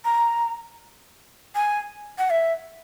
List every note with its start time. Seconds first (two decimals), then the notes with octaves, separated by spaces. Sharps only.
0.05 A#5
1.55 G#5
2.19 F#5
2.30 E5